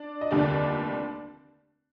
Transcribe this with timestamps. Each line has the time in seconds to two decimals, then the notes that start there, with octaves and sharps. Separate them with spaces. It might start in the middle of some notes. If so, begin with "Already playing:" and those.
Already playing: D4 D5
0.21 D#5
0.31 F1 D#2 D3 G3 D4 D5